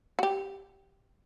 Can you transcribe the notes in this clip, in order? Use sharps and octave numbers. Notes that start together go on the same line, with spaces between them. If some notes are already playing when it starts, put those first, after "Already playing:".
F#4
G4